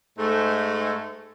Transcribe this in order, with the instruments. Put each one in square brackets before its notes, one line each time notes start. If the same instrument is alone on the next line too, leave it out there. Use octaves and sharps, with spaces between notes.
[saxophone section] G#2 A3